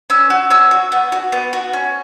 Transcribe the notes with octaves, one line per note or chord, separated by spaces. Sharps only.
C#4 E6
F#4
C#4 E6
F#4
B3
F#4
B3
F#4
C#4